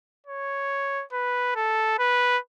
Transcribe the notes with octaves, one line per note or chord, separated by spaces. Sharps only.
C#5
B4
A4
B4